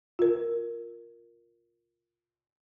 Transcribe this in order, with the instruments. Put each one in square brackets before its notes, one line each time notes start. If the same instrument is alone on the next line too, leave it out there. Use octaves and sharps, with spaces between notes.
[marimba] F4 A#4